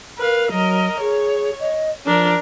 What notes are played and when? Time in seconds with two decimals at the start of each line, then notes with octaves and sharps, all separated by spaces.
0.18 A#4 B4 F5
0.51 F#3 A#4 D#5
1.00 G#4 C#5
1.60 D#5
2.06 F3 D4 A#4